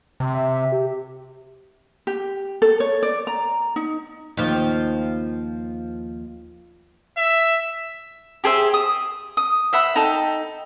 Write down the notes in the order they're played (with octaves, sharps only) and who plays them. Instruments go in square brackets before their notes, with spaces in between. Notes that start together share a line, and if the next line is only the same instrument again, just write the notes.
[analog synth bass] C3
[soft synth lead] E5
G4
[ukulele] G4
A4
C#5
D5
A#5
D#4
[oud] D#2 F3
[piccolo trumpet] E5
[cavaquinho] G4 G#4 C5 E5
D#6
D#6
C5 E5 F#5 B5
D#4 A4 G5